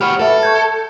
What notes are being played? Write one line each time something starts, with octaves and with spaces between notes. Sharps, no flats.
G4 C#5 F#5 B5 F6
A4 B4 E5
C#6 G6 G#6